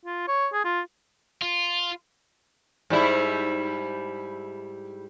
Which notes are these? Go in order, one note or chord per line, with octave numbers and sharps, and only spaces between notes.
F4
C#5
G#4
F4
F4
G#2 G3 E4